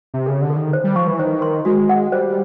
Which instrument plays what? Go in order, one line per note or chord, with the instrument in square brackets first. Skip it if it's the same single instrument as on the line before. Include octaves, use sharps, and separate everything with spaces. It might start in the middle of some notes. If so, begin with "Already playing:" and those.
[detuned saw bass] C3
[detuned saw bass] C#3 [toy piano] A4
[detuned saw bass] D3
[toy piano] A4
[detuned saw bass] D#3
[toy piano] C5
[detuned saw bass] G3
[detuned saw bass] F3 [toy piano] C#6
[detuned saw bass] E3
[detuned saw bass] D#3 [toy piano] C5
[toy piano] C6
[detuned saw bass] G#3 [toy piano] F#4
[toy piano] F#5
[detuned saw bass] G3 [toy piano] C5